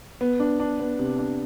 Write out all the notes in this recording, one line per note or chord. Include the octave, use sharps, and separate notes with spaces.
B3
D4
D4
B3
C3
D4